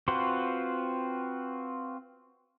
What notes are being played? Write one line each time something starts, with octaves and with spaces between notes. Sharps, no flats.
C4 F4 F#4 B4 C5